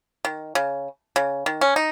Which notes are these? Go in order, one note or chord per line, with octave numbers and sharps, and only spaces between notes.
D#3
C#3
C#3
D#3
C#4
D#4